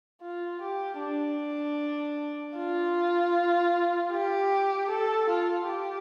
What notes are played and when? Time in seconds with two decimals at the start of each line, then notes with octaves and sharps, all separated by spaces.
0.22 F4
0.62 G4
1.00 D4
2.57 F4
4.12 G4
4.90 A4
5.30 F4
5.68 G4